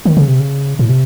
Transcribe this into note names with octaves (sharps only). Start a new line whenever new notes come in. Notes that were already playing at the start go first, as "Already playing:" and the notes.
D#3
C#3
C3
C#3
A2
C3